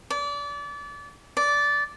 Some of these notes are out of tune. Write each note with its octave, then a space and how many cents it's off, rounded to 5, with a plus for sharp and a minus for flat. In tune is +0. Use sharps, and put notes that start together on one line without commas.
D5 -30
D5 -15